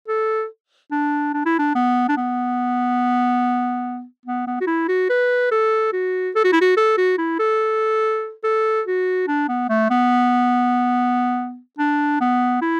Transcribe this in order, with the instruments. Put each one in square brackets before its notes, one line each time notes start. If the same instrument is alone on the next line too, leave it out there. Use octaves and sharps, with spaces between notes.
[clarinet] A4
D4
D4
E4
D4
B3
D4
B3
B3
B3
F#4
E4
F#4
B4
A4
F#4
A4
F#4
E4
F#4
A4
F#4
E4
A4
A4
F#4
D4
B3
A3
B3
D4
B3
E4